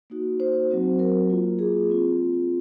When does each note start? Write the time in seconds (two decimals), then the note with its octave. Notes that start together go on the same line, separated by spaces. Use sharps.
0.10 A#3 D#4 F#4
0.40 C5
0.70 F#3 C4 F#4
0.99 A#4
1.30 A#3 F4
1.59 G#4
1.89 C4 F4